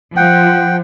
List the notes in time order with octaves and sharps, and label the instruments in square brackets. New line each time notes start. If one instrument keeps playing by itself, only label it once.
[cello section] F3 [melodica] F#5 G5